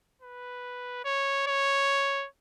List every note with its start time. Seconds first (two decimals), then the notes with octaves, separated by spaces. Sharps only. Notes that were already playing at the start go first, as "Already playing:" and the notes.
0.22 B4
1.05 C#5
1.47 C#5